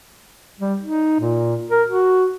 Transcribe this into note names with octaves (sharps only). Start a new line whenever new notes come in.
G3
D#4
A#2
A#4
F#4